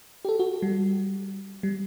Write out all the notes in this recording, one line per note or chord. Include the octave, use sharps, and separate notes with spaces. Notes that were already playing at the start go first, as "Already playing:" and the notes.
G4
A4
F#4
G3
G3